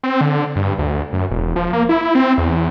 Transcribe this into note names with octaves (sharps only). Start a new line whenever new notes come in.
C4
D3
G2
D2
F#2
E1
F3
A#3
E4
C4
E2